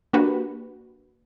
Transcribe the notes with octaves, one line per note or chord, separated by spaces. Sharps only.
A#3 D4 F#4 G4 B4